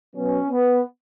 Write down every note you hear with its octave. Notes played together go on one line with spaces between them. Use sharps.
B2 F#3 B3 C#4
B3